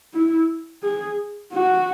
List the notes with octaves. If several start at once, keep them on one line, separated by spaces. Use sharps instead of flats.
E4
G#4
F#4